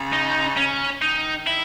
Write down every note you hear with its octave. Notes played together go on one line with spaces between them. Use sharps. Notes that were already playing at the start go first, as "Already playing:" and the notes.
Already playing: C#3
D#4
C#4
D#3 D#4
E4